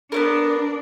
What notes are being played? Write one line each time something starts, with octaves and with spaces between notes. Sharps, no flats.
B3 C#4 D4 A#4